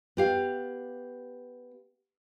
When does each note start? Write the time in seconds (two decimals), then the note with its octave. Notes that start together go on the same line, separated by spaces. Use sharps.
0.17 B3 G4 F5